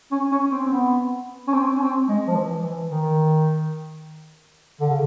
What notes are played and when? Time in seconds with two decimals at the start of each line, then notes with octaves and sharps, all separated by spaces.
0.12 C#4
0.32 C#4
0.52 C4
0.66 C4
0.72 B3
1.48 C#4
1.54 C4
1.76 C#4
1.82 C4
2.09 G#3
2.28 F3
2.36 E3
2.63 E3
2.91 D#3
4.81 D3
4.90 C#3